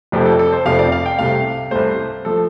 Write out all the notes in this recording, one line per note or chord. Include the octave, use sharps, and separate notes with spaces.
F1 F2 C3 A3
A4
A4
C5
F1 F2 C3 A3 F5
D5
F5
G5
C2 C3 A3 F5
C2 C3 A3 C5
F3 A3 A4